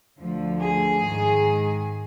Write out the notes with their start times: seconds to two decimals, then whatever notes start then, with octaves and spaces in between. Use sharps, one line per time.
0.18 D2 D3 F3
0.59 G#4
1.00 G#2 D#3